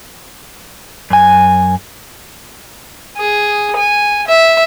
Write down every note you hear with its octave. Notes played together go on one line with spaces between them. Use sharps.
F#2 G#5
G#4
G#5
E5